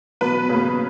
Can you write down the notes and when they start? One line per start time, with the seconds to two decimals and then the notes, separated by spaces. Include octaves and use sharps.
0.21 B2 F#3 B3 B4
0.49 C#3 F#3 A#3